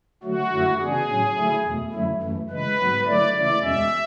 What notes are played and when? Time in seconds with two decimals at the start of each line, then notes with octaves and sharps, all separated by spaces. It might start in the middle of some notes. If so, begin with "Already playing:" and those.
0.23 D3 F#3 A3 F#4
0.52 F#2 D3 F#3 A3 E4
0.79 C#3 E3 B3 D4 G#4
1.08 A2 F#3 C#4
1.37 D3 F#3 A3 E4
1.64 E2 B2 A3
1.93 F#2 D3 F#3 A3 E4
2.22 F#2 E3 A3
2.50 C#3 E3 G#3 B4
2.78 G#2 F#3 B3
3.06 D3 F#3 A3 E4 D5
3.34 C#3 E3 A3 E4 D5
3.62 E2 B2 G#3 C#4 E5